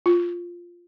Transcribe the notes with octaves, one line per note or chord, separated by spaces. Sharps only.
F4